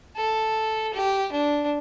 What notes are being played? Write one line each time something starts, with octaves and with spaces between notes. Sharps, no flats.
A4
G4
D4